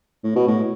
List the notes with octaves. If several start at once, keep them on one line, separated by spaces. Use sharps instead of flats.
A2
B2
A2